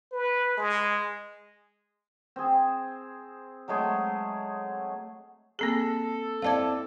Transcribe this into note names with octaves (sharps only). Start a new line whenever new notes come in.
B4
G#3
C4 G#4
F#3 G#3 A3 G#4
A#3 C4 G#4 A4
C4 E4 D5 F5 A5 G#6